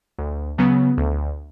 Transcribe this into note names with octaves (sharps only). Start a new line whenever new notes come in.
D2
C#3 F#3 B3
D2